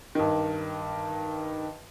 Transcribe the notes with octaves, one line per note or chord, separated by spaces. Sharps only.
G2 D#3